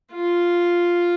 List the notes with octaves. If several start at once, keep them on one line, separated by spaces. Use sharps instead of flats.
F4